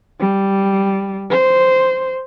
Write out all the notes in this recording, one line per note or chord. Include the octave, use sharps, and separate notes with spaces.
G3
C5